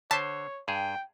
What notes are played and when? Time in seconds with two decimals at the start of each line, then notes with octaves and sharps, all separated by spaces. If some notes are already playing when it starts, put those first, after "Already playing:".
0.11 D3 C5 C#5 A5 B6
0.68 G2 G#4 G5